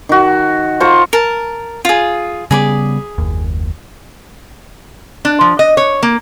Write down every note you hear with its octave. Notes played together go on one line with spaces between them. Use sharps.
D#3 F#4
F4 C5 A#5 C#6
A#4 A5
F4 G#4
C#3 G3 B3 G#4 B5 D6
F#1 D#2
D4
F3
D#5
C#5
A#3